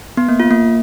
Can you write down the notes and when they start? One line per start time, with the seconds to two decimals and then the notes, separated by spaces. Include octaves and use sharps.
0.17 B3
0.29 A#3
0.40 F4
0.51 A#3